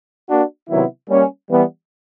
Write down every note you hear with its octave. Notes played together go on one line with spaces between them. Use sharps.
A#3 D4 F#4
C3 D#3 F#3 B3 E4
G3 A#3 C#4
E3 G3 B3